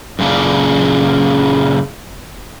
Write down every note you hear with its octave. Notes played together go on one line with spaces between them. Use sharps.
F#2 A#2 C#3 D4